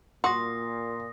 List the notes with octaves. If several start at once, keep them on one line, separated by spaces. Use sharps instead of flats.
A#2 F#4 C6 D#6 A#6